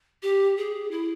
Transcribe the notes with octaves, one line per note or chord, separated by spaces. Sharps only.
G4
G#4
E4